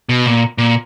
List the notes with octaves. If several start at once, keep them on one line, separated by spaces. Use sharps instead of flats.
B2
A#2
A#2